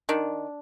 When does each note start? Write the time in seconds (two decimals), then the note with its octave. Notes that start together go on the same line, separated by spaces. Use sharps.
0.09 D#3 D4